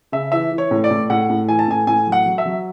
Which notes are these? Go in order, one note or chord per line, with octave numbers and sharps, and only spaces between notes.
C#3 E5
E3 E5
E3
C#5
A2
D5
A2
A2 F#5
A2
E3 G#5
A5
A2 G#5
A2 G#5
F#3
F#5
F#3
E5
F#3